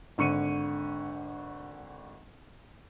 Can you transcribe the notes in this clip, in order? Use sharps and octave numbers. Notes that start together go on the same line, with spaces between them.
G#1 D3 C#6 C#7 D#7